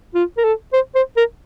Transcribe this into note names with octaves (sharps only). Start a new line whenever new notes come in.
F4
A#4
A4
C5
C5
A#4